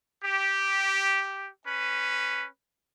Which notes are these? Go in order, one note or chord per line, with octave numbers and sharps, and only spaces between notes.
G4
C#4 B4